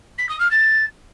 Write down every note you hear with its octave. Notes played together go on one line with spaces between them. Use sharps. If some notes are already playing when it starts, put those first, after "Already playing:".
B6
D#6
F6
A6